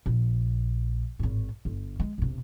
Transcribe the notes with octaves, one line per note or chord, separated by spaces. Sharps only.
A#1
G#1 A2
G1
G#3
E1 C3